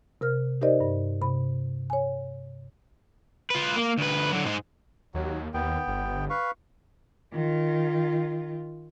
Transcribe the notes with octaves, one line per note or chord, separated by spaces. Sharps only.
C3 A#4 F6
D#4 G4 A#4 C5 D5 D#5
G2
C3 B5
C#5 G#5
F4 B4
A#3
D2 B4
D3 F#3
G#2 G#3
D#2 F#3
D#2 B3 G5
G1
B4 F5 C#6
D#3 F4